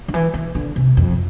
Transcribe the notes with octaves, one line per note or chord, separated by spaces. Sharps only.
D3
E3
E3
D3
C3
F2